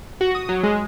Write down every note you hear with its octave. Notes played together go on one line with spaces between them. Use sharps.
F#4
D#6
F#3
G#3